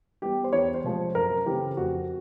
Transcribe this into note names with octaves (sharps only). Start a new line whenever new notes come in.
E3 G3 B3 G4
C5
E2 C#5
C5
C3 F3 G#3
F#2 A#4
C#3 E3 A3 C4 G4
F2 F#4